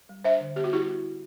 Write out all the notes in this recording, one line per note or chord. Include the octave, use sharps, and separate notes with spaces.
G3
D4 C5 E5
D3
B3 G4
F#4
G3 E4 G4